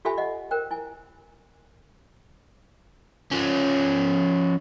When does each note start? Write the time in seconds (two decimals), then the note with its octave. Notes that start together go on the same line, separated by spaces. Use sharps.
0.05 F4 G4 A4 E5 G#5 B5
0.18 D#5 F#5
0.51 A#4 C5 G5
0.71 E4 G#5
3.31 F3 C#4